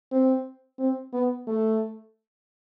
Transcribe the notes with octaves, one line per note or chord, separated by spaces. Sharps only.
C4
C4
B3
A3